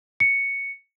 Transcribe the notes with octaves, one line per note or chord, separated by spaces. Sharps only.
C#7